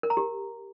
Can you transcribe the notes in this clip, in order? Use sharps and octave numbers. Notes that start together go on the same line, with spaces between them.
A#4
A#5
G4